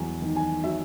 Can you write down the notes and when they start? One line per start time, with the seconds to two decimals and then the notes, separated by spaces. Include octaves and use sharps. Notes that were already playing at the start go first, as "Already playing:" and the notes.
Already playing: E2 F#3 G#5
0.22 D#3
0.36 G#5
0.64 F#3 E5